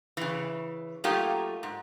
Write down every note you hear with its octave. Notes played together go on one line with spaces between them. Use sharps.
C#3 E3
F#3 A3 A#3 D#4 F4 G4
G#2